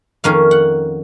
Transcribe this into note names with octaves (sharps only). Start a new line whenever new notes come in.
F2 D#3 A#3 C#4 F5
F#5